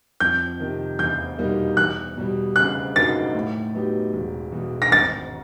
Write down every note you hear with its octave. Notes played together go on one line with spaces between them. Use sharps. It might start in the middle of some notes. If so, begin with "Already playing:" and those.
F2 G6
C3 D#3
E2 G6
B2 G3 A#3 D#4
E2 F#6
B2 G3
C#3 F#6
F#3 A#3 D#4 A6
A2
F#3 B3 D#4 G4
E1
E2 B2
A#6
G#1 A6